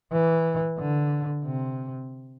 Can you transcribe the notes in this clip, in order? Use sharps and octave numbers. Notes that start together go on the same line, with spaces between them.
E3
D3
C3